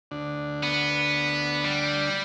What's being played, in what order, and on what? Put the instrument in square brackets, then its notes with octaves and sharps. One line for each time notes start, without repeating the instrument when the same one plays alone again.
[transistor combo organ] D2 D4
[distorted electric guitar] B3
G3